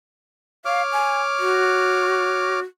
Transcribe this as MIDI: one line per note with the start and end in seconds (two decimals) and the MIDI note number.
0.65 2.60 73
0.65 0.83 77
0.65 2.60 86
0.65 2.60 89
0.93 1.21 80
1.40 2.62 66